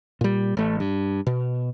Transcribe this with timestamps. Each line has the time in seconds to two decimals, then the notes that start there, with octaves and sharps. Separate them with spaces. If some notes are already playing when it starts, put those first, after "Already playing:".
0.21 A#2 G3
0.57 A1 A3
0.80 G2
1.27 B2